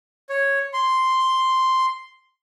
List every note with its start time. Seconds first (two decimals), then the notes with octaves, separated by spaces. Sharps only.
0.29 C#5
0.73 C6